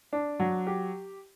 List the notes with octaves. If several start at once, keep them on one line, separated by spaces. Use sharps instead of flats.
D4
F#3
G4